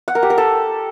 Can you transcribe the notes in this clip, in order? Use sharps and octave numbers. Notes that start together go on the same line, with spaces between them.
F#5
A#4
G4
A#4
A4